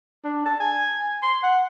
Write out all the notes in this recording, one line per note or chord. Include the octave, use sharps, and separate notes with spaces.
D4
A5
G#5
C6
F#5